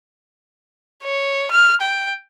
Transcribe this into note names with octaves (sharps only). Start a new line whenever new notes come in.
C#5
F6
G5